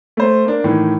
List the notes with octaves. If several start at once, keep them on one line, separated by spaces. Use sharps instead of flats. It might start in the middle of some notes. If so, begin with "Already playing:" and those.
A3 C5
A#3 D4
A2 D#3 E3